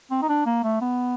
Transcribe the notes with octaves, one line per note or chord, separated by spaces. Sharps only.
C4
D#4
D4
A#3
A3
B3